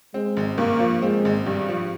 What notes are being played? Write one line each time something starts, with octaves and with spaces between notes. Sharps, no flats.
G#3 C4
G#1
G2 A#3
F3
G#3 C4
G#1
G2 G3
F3